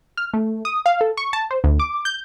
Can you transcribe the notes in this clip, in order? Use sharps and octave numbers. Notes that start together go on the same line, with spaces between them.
F6
A3
D#6
F5
A4
C#6
A5
C5
D2
D6
G6